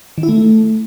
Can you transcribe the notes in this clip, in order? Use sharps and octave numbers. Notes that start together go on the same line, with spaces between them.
D#3
E4
A3